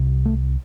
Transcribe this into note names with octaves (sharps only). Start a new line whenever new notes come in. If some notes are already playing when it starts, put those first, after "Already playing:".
Already playing: C2 C3
A3